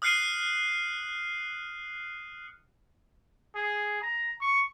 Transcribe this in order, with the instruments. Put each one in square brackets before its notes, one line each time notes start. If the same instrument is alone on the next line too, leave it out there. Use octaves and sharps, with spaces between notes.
[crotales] D#6 F6 F#6 C7 C#7 D#7
[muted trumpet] G#4
A#5
C#6